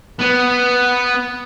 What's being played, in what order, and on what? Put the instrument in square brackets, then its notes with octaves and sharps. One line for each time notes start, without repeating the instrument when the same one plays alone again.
[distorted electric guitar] B3